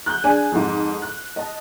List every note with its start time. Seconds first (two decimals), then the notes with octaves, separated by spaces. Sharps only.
0.06 F#6 G6
0.24 D4 G#4 G#5
0.52 F2 G#2
1.02 F#6
1.36 D#5 A5